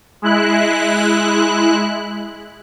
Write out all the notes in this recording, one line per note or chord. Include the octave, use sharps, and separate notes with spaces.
G#3 E4 F#6